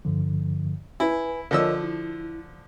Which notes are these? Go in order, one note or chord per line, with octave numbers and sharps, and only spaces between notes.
G2 D3 F3
E4 B4 G#5
D3 F3 A#4 C#5 D#5 E6
E4